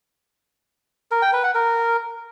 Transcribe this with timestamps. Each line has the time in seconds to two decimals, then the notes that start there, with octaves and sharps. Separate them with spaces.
1.11 A#4
1.22 G5
1.33 B4
1.44 F#5
1.55 A#4